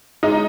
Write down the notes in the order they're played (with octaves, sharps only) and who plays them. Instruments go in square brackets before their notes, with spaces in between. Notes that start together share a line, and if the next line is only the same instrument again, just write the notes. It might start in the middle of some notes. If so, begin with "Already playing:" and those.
[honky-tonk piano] G#3 D#4